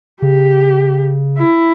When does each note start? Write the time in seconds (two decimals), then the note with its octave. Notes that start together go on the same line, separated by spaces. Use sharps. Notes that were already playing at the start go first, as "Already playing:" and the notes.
0.22 C#3 G4
1.38 E4